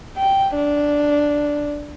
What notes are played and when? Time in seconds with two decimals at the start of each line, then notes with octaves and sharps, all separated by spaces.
0.17 G5
0.56 D4